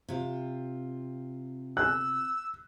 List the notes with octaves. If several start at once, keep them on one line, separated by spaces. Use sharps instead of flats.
C3 F4
E6 F#6